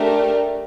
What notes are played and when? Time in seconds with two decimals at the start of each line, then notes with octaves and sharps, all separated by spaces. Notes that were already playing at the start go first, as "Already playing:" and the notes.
Already playing: A3 D4 G4 A#4